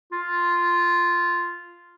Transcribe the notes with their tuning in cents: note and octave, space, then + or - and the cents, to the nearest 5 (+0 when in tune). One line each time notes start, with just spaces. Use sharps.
F4 -5